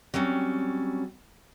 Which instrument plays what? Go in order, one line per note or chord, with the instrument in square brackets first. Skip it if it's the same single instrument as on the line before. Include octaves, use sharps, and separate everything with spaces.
[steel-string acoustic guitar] F#3 G3 C4 C#4